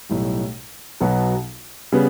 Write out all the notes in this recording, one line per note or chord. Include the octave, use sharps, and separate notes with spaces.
B1 A2 G3
B1 B2 F#3 B3 F#4
C#3 G3 B3